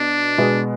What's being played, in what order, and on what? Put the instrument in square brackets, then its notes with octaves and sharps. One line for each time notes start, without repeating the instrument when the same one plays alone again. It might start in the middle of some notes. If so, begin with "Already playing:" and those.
Already playing: [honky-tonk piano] B2 B3 [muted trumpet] D4
[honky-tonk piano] B2 G#3 B3